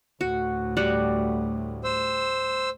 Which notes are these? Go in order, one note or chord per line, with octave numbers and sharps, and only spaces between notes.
D2 A2 F#4
G3 F#4 F#5
C5 E6